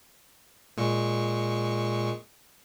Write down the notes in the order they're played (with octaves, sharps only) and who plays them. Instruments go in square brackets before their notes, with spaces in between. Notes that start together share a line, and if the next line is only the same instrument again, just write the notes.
[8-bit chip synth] A#2 G#3 C#6